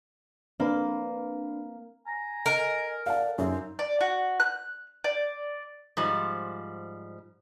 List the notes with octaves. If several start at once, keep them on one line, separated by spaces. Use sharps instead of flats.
A#3 C4 D4 B4
G#5 A#5
A#4 D#5
D5 F5 F#5 A5
F#2 C4 D#4
D5
F#4
F#6
D5
G#2 F3 G3